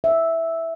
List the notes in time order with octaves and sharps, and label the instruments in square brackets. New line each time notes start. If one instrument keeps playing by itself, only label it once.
[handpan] E5